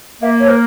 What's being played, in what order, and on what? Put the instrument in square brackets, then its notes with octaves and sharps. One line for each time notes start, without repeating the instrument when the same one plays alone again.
[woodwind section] A#3 [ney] E5
[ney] C#5
A#4